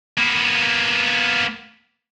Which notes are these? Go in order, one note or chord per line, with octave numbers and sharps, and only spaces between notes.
A#3 B3